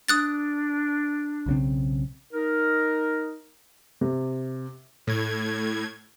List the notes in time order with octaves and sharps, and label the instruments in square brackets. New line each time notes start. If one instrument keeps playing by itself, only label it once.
[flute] D4 [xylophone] D#6 F#6 A6
[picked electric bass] B1 C#3 C4
[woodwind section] D#4 A#4
[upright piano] C3
[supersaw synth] A2 G#6